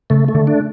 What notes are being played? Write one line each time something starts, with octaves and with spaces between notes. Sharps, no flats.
C#3 A3
A3
D3
D4